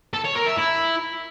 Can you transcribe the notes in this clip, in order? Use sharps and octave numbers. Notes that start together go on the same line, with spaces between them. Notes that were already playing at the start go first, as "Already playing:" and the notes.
A4
C#5
A#4
E5
E4